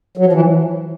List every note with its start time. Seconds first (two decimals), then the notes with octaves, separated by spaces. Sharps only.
0.17 F#3
0.26 F3
0.33 E3